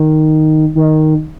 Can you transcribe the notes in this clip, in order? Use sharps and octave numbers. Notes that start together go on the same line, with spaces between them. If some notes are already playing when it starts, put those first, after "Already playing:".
Already playing: D#3
D#3